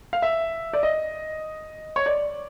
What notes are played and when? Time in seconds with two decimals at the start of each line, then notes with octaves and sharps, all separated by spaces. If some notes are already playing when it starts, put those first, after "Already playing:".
0.13 F5
0.22 E5
0.73 D5
0.83 D#5
1.96 C#5
2.06 D5